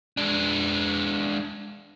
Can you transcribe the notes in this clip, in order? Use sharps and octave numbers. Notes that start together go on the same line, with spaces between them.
G#3 D4